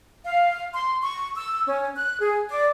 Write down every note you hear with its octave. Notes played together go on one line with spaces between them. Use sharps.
F5
C6
C#6
E6
C#4
F#6
G#4
D5